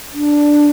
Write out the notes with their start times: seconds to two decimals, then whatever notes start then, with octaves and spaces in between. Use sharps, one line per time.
0.13 D4